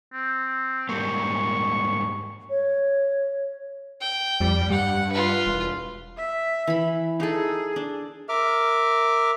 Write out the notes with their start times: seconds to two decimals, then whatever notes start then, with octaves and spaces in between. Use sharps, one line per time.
0.13 C4
0.89 G#2 G3 A#3 C#6
2.50 C#5
4.01 G5
4.41 F2 G3
4.70 G2 G3 F#5
5.12 F4 B4
5.46 E1
6.17 E5
6.67 E3 B5
7.20 D#4 G#4 A4
7.76 D4
8.29 A#4 E5 D6 F6